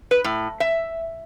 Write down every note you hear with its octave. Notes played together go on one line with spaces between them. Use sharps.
B4
A2
E5